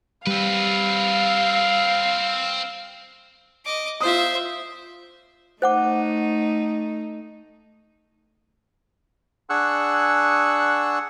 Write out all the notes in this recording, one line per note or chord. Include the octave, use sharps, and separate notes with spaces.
G3 C4 B4 F5
D#5 D6
F4 C5 E5 D#6
A3 D#4 C5 F#5 D6
D4 G#4 F#5 C#6 E6 F#6